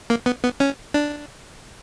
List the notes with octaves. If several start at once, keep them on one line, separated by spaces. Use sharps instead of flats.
A#3
B3
B3
C#4
D4